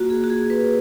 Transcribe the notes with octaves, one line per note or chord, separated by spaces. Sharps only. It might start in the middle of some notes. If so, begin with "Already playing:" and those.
Already playing: A#3 F4 F#4
G#4
F#4
G#4
B4